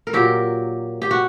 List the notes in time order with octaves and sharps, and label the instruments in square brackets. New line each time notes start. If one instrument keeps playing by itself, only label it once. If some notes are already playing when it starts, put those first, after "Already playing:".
[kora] A#4
A#2 F#3 G4
G4
F#4